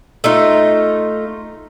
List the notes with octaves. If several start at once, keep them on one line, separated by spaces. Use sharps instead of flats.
A3 D#4 F4